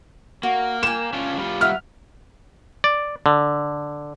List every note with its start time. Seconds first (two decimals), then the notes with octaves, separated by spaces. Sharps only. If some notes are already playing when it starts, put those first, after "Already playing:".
0.43 A#3 F#4
0.83 G5 G#5 E7
1.13 C#4 D4 F4
1.38 G3 F4
1.61 B4 E5 F#5 F6
2.84 D5
3.26 D3